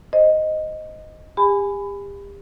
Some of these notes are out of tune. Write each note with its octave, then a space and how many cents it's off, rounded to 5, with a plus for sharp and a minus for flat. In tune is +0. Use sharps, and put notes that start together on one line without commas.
C5 -5 D#5 +0
G4 +35 G#5 +0 B5 +20